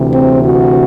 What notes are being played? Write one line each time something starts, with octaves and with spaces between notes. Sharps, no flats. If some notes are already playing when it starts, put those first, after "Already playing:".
Already playing: D2 C3 E3
C4
F#4